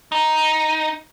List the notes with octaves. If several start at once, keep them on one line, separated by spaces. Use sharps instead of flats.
D#4